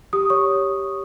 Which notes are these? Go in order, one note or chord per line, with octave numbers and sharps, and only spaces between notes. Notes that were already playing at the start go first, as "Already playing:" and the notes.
G4 D#6
C#5 C#6